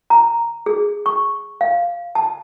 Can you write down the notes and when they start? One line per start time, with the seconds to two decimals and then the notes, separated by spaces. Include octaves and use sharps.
0.10 A#5
0.66 G#4
1.06 C#6
1.61 F5
2.15 A5